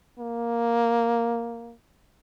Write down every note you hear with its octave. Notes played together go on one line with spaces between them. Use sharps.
A#3